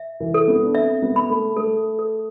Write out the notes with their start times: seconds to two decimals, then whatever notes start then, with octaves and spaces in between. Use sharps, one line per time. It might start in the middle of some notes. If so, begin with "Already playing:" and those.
Already playing: E5
0.20 E3
0.34 A4
0.48 B3
0.65 D4
0.75 C4 E5
1.02 B3
1.16 B5
1.30 A3
1.57 A3 A4
1.99 A4